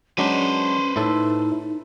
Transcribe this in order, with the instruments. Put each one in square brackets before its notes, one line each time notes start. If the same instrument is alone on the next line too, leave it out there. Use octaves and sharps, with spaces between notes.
[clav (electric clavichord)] F#3 G#3 D4 [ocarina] C#4 [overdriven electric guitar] B4 C5
[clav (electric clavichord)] A2 E4 A4 [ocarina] D#4